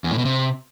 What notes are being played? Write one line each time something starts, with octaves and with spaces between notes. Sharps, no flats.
E2
A2
B2
C3